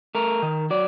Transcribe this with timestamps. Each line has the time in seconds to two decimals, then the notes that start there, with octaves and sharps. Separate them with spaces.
0.15 A3 A#4
0.42 D#3
0.70 F#3 D5